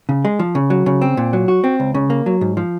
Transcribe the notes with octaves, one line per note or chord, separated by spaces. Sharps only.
C#3
G#3
F3
C#3
F#3
C#3
C4
A#2
F#3
F#4
C4
C#2
C#3
A#3
F#3
G#2
F3